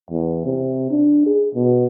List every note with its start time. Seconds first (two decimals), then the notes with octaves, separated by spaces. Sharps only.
0.10 E2
0.45 C3
0.91 D4
1.26 G#4
1.55 B2